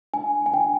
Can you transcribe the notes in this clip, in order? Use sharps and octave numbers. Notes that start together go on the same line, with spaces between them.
D4 G#5
G#5
D4 G5